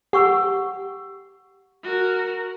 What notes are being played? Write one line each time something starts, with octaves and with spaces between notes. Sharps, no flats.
G4 F#5 C#6 E6
F#4 A#4